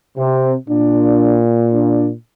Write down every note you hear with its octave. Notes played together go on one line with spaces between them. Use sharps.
C3 C4
A#2 D4
D4